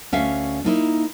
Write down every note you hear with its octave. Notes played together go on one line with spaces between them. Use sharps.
D2 C#4 E5 F5
A#3 D#4 E4